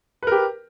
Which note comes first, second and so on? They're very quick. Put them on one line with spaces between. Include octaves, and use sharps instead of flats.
B4 A#4 G4